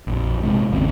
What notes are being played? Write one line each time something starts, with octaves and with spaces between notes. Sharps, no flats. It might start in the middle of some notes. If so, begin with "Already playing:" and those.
A#1 F2
G#2 C3 G#3
G#1 D#2 C#3 C4